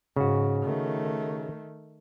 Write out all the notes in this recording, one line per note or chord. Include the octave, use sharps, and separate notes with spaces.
G#2 C#3 F#4
D#3 A3